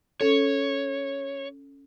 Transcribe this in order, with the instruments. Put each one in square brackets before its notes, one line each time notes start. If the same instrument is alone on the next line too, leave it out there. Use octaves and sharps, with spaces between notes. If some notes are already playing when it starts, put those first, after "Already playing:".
[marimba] C#4 A4 [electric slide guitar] C#5